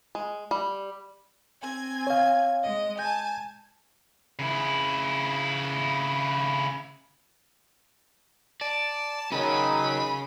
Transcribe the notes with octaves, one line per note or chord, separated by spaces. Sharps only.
G#3
G3
C4 G#5 G#6
C#5 F5
G#3 D#5
G#5 A5 G6
C#3 E4
D5 A5
D#3 F#3 C#4 G#4 B5